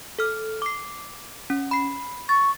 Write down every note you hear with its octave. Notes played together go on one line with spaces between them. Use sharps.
A4 F6
D6 C7
C#4
B5 C7
C#6 A6